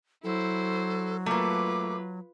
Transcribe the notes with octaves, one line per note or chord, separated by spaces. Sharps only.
F#3 E4 A4 C5
A3 A#3 F4 B4 D6